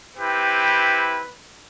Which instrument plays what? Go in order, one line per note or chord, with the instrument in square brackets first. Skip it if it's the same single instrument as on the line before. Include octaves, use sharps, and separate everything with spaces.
[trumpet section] C4 E4 G4 B4